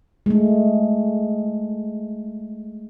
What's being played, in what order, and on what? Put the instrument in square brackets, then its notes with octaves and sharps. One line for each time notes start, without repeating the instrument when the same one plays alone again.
[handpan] G#3 A3